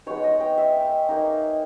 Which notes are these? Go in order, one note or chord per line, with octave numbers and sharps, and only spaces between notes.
G#3 B3 D#4 C#5
D#5
G5
E5
A#3 D#4